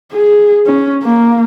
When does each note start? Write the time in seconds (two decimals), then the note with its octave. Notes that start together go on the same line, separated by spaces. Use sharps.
0.13 G#4
0.66 C#4
1.03 A#3